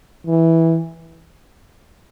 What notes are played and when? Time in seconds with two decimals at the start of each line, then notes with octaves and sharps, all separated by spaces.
0.27 E3